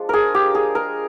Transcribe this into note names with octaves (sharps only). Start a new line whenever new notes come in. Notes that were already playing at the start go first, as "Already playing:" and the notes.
Already playing: F3 G#3 D4 F4
G#4 A#4
G4
G#4
A#4